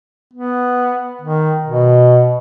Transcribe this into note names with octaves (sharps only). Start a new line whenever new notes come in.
B3
D#3
B2